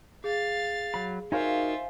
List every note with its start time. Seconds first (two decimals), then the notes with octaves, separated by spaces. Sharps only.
0.24 G#4 F5 A6
0.94 F#3 B5
1.32 D#4 F4 F#4 A#4 C5 E5 F5 G#5